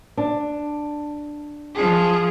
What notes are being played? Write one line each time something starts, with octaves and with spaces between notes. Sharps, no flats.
D4
F3 G#4